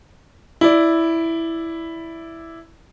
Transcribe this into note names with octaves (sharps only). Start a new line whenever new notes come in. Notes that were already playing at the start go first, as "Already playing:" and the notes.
E4 D5